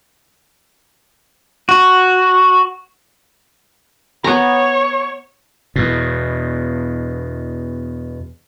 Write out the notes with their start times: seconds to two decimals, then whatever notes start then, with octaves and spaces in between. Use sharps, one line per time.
1.69 F#4
4.24 B3 C#5 A#5
5.76 E2 B2